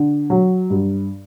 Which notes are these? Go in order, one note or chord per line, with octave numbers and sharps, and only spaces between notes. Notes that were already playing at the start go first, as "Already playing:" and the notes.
Already playing: D3
F#3
G2